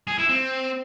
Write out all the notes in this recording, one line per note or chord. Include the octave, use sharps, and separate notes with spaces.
G#4
E4
C4